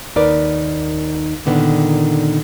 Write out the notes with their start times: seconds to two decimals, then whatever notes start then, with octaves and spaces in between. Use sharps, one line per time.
0.16 D#2 D#4 A#4 B4 D5
1.46 A#2 D3 D#3 B3